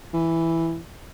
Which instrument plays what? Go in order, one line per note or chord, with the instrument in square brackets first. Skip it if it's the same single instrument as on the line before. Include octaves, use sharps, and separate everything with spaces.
[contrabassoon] E3